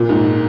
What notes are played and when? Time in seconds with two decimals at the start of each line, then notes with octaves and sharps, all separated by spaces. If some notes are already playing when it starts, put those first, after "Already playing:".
Already playing: A#2
0.09 G#2